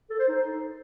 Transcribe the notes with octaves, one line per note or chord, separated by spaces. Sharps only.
A4
C5
D#4